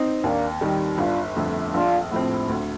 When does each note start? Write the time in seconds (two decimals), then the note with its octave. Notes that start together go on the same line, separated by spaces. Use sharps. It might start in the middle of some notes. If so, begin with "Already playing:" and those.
Already playing: C4 D#4
0.23 D#2 A#3 D4
0.61 D#3 G3
0.98 G1 D4 F4
1.36 F2 D3 A3
1.74 A#1 D4 F4
2.11 A2 F3 C4
2.49 D2